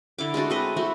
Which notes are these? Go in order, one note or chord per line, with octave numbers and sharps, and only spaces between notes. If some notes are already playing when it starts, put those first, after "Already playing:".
D3 E4 D6
G#3 A3 D4 F#4
C4 B4 D#5
A3 E4 F#4